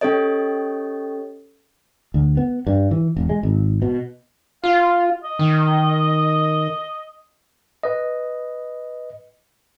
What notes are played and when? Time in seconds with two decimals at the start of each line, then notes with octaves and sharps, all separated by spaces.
0.01 C#4 G4 A4 C#5 D#5
2.14 D2
2.37 B3
2.67 G2
2.91 E3
3.17 E1
3.29 G#3
3.43 G#1
3.82 B2
4.64 F4 F5
5.23 D#5
5.39 D#3
7.83 B4 D#5